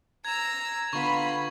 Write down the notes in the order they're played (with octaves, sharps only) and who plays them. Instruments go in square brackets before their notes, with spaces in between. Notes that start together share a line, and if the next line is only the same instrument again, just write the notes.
[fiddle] A#5 E6 [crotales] G#6
[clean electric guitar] D3 B3 [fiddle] F4 [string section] B5 [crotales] C#6